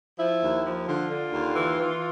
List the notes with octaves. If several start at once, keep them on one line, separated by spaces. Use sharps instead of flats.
F3 E4
D#2
F3
D3 F4
D3
D#2
E3
E3